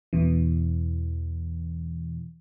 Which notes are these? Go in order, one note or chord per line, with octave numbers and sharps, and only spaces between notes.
E2 B2 E3